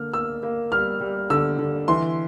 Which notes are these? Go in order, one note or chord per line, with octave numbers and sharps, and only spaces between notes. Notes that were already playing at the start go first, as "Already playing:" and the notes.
Already playing: D3 A#3 F6
A#3 E6
A#3
G3 F6
G3
D3 E6
D3
E3 C6